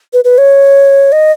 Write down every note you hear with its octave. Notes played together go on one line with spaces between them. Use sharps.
B4
B4
C#5
D#5